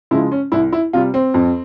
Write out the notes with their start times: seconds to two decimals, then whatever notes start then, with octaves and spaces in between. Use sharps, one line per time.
0.11 C#3 F3 G#3 E4
0.32 C#4
0.52 C2 E4
0.72 E4
0.93 C3 G3 F4
1.14 C4
1.34 F2